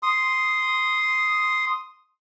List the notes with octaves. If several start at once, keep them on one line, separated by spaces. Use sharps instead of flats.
C6 D#6